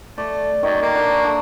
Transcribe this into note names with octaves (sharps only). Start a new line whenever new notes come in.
A3 D5
F#2 D#3 C#5 D#5
A#3 G5
D4 F#4 D5
A3 D4 A#5